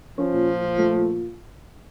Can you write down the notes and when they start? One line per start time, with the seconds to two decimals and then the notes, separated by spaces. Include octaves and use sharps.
0.18 F3 C#4
0.33 A#2
0.48 A#2
0.63 A#2
0.78 A3
0.93 A#2